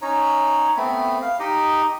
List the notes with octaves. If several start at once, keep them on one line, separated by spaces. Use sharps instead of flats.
C#4 D#4 C#5 A#5
A3 B3 C4 B5
F5
D#4 G4 D#5